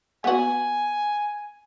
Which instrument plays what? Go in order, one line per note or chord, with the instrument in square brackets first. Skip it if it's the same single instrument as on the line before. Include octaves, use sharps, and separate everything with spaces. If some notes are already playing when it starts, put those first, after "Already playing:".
[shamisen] B3 F#4 [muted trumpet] G#5